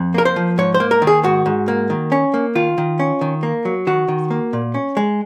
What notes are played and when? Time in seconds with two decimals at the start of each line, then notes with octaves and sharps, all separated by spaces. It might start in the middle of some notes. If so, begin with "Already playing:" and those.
Already playing: F2
0.14 A#3 A#4
0.25 C5
0.36 F3
0.58 G#2 C#5
0.74 C5
0.80 A#3
0.91 A#4
1.02 D#3
1.07 G#4
1.24 G#2 F#4
1.46 G#2
1.68 A#3
1.90 D#3
2.12 C#4
2.34 A#3
2.55 D#3 F4
2.78 D#3
3.00 C#4
3.21 D#3
3.43 A#3
3.65 F#3
3.87 D#3 F#4
4.08 D#3
4.30 A#3
4.53 A#2
4.74 C#4
4.97 G#3